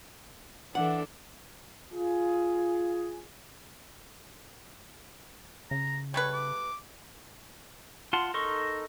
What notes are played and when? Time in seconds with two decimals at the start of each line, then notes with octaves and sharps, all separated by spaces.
0.75 E3 D4 A4 F#5
1.93 F4 G#4
5.71 C#3 A#5
6.14 G3 A3 B4 C#5
6.33 D6
8.13 F4 F#5 A5 C6
8.34 D#4 A4 A#4 C6 C#6